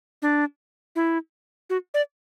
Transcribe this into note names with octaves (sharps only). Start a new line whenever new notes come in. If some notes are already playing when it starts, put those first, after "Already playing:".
D4
E4
F#4
D5